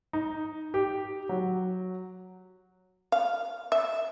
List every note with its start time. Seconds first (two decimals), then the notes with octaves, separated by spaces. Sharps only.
0.13 D#4
0.74 G4
1.29 F#3
3.12 F5
3.72 E5